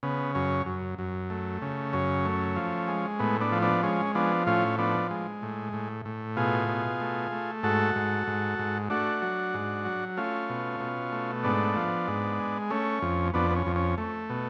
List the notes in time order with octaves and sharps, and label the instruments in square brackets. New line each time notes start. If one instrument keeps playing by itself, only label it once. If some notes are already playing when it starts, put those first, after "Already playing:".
[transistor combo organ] C#3 B3
F#2 C#4
F#2
F#2
A3
C#3
F#2 C#4
A3
F3
G#3
A2 B3
B3 D4
F3
B3 D4
G#3 C#4
F3 B3 D4
A2 C#4 F4
F3 B3 D4
G#3
A2
A2
A2
B2 F4 G#4
B2
A3
A3
G#2 F#4 A4
G#2
G#2
G#2
A3 D4 F#4
F#3
G#2
F#3
A3 C#4 F4
B2
B2
A3
G#2 B3 D4
F3
G#2
G#3
A3 C#4
F2
F2 B3 D4
B3
C#4
F2
C#4
A3
B2